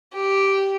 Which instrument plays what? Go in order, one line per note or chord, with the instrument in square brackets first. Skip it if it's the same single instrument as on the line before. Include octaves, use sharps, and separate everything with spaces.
[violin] G4